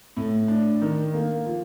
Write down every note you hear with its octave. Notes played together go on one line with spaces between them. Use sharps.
A2
D4
D#3
A#3
F3